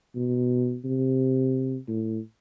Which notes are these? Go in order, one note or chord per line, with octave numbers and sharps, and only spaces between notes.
B2
C3
A2